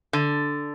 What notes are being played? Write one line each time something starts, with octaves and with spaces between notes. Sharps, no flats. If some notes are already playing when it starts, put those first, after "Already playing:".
D3